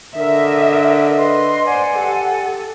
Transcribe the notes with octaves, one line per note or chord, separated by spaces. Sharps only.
D3 A#4 D#5 E5
B4 D#5 C6
C5 D5 F#5 G#5
G4 A4